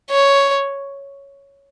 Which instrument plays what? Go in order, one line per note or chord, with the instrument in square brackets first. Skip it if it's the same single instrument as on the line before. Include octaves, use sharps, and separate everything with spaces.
[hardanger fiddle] C#5